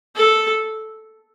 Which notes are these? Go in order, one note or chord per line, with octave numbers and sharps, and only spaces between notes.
A4